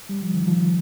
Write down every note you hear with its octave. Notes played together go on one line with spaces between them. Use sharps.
G3
F3
D#3
F3